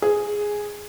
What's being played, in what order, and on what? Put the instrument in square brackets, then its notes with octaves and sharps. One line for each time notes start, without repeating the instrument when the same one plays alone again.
[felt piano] G#4